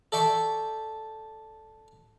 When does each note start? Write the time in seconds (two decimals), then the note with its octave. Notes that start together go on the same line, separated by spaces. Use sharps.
0.12 A4 D5 E5 G5 C#6